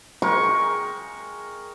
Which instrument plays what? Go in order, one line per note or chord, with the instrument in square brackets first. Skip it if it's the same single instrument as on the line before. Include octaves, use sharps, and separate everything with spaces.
[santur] G#3 A#4 G5 [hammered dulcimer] C#6